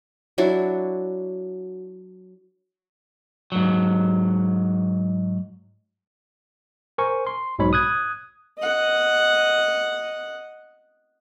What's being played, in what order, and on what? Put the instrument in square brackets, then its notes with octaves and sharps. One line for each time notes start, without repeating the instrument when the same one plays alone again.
[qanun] F#3 D4 E4 F#4
[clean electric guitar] G#2 F#3
[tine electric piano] A#4 C5 G#5 C#6
C6
B1 G#2 B2 B3 C#5 B5
D#6 F#6 G#6
[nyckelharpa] D#5 F#5